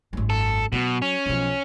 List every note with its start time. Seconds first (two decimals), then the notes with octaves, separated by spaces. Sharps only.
0.13 G#1 F#2
0.30 A4
0.72 B2 F#3
1.02 C#4
1.26 B1 F3